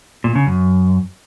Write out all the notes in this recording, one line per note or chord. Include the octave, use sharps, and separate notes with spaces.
A#2
C#3
F#2